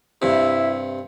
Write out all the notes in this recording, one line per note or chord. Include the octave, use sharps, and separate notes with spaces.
G2 C3 E4